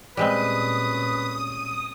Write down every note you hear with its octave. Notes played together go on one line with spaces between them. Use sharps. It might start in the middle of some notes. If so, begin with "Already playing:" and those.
A#2 G3 G#3 C4 C#4 B4 D#6